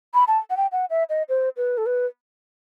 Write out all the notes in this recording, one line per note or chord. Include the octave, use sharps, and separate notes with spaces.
B5
A5
F#5
G5
F#5
E5
D#5
C5
B4
A4
B4